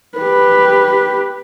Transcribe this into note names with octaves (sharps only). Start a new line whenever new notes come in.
G4 B4